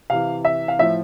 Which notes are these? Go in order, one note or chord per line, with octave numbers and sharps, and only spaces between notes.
C3 E3 F5
E5
F5
A2 F3 E5